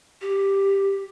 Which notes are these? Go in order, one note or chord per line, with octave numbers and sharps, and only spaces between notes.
G4